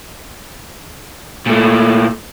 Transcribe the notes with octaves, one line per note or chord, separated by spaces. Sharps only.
A#2 A3